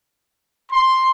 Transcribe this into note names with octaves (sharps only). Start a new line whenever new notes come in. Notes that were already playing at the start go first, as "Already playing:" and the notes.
C6